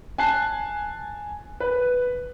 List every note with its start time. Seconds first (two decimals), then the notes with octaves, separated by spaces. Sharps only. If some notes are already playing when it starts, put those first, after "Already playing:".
0.18 G#5 A5 F#6 C7
1.60 B4